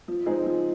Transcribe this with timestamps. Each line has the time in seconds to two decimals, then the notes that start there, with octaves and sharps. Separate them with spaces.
0.08 F3
0.26 G#3 C4 D#4 G#4
0.46 F3